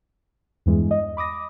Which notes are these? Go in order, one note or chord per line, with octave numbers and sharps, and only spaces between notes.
E2 G2 E3 G#3
D#5
B5 D6 D#6 A#6